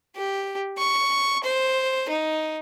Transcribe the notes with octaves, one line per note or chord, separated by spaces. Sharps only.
G4
C#6
C5
D#4